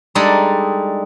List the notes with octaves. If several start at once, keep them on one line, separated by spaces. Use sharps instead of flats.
G3 G#3 D4 D#4 G#4 A4